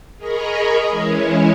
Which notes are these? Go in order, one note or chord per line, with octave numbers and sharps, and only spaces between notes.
G#4 A#4 D#5 A#5 B5 C#6
E3 G#3 C#4 E4 C#5